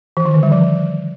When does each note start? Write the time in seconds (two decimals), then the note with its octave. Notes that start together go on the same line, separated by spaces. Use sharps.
0.17 E3
0.25 D#3
0.34 D3
0.43 G3
0.52 F3